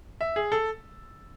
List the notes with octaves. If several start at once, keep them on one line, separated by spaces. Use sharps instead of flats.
E5
G#4
A4